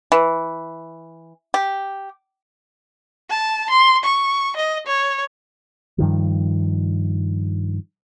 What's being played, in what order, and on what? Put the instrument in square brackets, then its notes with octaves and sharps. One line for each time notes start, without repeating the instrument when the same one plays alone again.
[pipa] E3
G4
[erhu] A5
C6
C#6
D#5
C#5
[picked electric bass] G2 D#3 F3